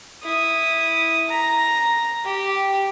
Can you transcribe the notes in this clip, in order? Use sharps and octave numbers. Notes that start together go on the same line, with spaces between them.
E4 D#6
A#5
G4